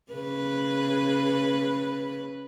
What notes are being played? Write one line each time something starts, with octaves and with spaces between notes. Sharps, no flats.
C#3 B4